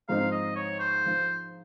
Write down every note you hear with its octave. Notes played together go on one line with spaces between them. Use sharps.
G#2 F3 C4 D#4 F5
D#5
C#5
C5
F3